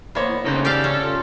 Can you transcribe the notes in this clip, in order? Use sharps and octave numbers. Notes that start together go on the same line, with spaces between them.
A#3 B3 C5 C#5
E4
A2 C#3 D#4 A4 C5
G4 A4 D5 F5
C#4
F4